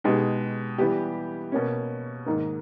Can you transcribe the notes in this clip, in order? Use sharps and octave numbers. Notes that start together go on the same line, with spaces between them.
B2 G#3 D#4 G4
E3 G3 B3 G4
B2 A#3 C#4
G#2 D#3 A#3 D#4